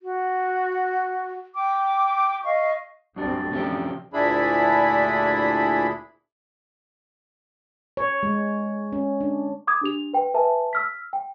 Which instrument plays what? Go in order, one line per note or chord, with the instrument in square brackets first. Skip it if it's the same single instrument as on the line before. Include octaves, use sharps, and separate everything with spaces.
[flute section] F#4
G5 D6
D#5 F5 C#6
[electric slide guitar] F#2 D4 D5 [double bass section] G3 A3 C4
[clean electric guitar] C3 C#4 G4 [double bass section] F3
[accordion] D2 A#2 D4 E4 G#4 B5
[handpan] C#5
G#3
C#4
D4
[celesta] D6 D#6 G#6
D4 G4 F7
B4 G5
B4 E5 G#5 A5
E6 F6 B6
G5